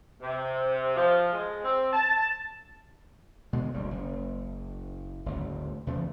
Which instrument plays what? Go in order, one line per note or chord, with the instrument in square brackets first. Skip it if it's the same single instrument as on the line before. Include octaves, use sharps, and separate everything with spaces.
[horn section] C3
F3
G#3
C4
A5
[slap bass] B2 D3 G#3
F#1 D2 G3
F#1
F#1 D2 G#2
E2 C#3 F3 A3